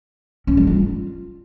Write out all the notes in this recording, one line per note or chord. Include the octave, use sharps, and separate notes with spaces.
C#4
G3
F4